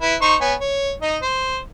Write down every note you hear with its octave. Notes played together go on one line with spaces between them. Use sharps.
E4 B4
D#4 C5 C#6
B3 C#5 G#5
C#5
D#4 D#5
C5